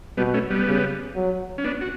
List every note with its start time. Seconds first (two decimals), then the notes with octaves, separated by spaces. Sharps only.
0.17 B2 G3 B3
0.34 A3 C#4
0.50 G3 B3
0.67 C#3
1.15 F#3
1.58 C#4
1.64 B3 D4
1.81 F#4